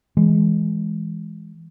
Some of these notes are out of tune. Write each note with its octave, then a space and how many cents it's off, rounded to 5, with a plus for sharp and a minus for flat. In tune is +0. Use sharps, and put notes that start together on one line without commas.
E3 +0 G#3 +0